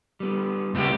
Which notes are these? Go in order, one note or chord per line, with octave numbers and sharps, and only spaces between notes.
G3 B3
C#2 B3 G4